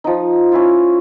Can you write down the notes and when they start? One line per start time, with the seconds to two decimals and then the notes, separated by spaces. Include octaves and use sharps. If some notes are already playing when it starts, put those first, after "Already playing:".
0.04 F3 D#4
0.52 C#4 E4 F4